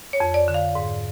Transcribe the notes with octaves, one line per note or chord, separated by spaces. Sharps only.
C#5
F2
D5
D3
F5
G#2